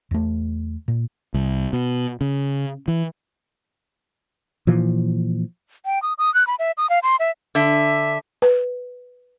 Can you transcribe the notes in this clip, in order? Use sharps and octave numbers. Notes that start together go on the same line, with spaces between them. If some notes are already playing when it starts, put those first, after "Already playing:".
E2 A3
A#2
C2
B2
C#3
E3
A#2 E3 F3
G5
D#6
D#6
F#6
B5
E5
D#6
F5
C6
E5
D3 E5
B4